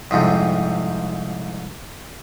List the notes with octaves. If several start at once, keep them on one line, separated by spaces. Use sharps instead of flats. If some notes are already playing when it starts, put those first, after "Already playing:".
C2 F2 G#2 C3